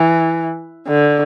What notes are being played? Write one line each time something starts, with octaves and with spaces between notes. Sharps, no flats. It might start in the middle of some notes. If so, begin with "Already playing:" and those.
Already playing: E3
D3